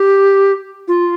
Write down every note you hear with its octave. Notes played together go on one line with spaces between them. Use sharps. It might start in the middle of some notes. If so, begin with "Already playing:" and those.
Already playing: G4
F4